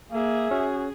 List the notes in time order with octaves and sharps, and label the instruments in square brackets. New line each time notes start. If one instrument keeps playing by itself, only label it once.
[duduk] A#3 [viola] G#4 [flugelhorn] E5
[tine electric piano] C#4 [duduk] F#4